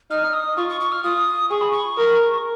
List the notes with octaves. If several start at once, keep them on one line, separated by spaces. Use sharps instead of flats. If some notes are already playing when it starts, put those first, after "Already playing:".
D#4 F6
D#6
F4 C#6
C#6
C#6
F6
F4 D#6
G#4 C#6
B5
C#6
A#4